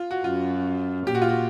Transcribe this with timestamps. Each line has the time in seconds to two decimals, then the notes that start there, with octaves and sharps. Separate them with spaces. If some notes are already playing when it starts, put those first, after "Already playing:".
Already playing: F4
0.11 F#4
0.24 F#2 F4
1.07 A#2 G4
1.15 F#4
1.22 F4
1.29 F#4